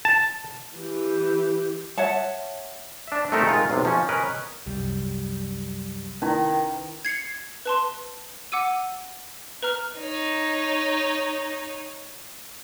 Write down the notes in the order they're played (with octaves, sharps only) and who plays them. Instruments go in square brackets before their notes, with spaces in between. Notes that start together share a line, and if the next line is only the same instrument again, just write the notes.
[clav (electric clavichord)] A5
[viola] E3 G4
[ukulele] C#5 E5 F#5 A5
[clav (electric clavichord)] D4 E5
A3 C4 D#4 A4 A#4
D#3 G#3 F4
B1 C3
F3 C#4
C#4 A#4 B4 D#5
[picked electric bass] C2 [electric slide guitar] F#2 G3
[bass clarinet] D#3 [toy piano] C#4 D#4 E4 [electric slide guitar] B4
[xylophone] G#6 C7 C#7
B4 A5 C6
F#5 D6 E6 D#7
B4 A#5 F6
[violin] D#4 C#5